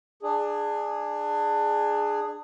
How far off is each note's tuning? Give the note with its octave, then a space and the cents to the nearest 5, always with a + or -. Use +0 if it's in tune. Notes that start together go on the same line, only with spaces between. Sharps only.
D4 +20 G#4 +0